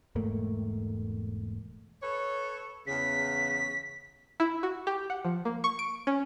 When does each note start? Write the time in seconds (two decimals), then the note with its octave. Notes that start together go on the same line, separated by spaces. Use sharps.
0.15 E1 G#2 A3 A#3
2.02 A4 B4 C#5
2.87 E2 C#3 B6
4.40 E4
4.63 F#4
4.87 G4
5.10 F#5
5.25 F3
5.45 A#3
5.64 C#6
5.79 D7
6.07 C#4